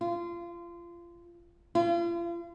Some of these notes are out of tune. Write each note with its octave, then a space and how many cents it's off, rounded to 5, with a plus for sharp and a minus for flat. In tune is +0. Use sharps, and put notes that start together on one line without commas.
F4 -25
F4 -40